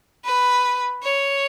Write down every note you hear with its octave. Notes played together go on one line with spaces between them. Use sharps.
B4
C#5